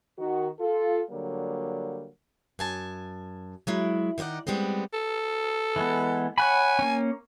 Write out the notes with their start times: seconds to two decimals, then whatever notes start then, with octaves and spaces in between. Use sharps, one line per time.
0.18 D#3 F#4
0.59 F4 A4
1.11 D3 F#3 G3 A#3
2.59 F#2 G#5 A5
3.67 F#3 G#3 E4
4.18 D#3 D#4 C#5 D5 F#5
4.47 G3 G#3 B3 C4
4.93 A4
5.76 E3 G#3 B3
6.38 C#5 F#5 G#5 B5
6.79 A#3 C#4